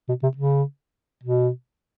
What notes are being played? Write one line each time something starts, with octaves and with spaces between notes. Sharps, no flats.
B2
C3
C#3
B2